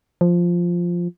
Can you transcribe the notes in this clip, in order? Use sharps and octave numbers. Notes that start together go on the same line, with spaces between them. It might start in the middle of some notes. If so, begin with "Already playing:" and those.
F3